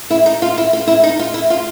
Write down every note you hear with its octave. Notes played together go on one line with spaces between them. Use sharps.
E4
D#4
F4
E4
F4
E4
D#4
F4
E4
F4